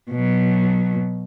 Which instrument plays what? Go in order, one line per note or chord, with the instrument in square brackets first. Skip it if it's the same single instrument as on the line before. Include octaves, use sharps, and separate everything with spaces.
[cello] B2 F#3